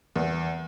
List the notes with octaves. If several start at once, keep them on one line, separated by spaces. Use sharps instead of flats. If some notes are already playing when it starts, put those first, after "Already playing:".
E2